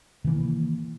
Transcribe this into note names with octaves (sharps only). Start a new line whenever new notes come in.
C3 D#3 E3 A#3